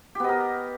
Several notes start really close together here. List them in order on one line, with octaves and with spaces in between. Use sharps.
G4 B3 D#5 A#4